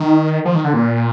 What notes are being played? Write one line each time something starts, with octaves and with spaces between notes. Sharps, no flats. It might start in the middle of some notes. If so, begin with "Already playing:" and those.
Already playing: D#3
F3
D#3
D3
A#2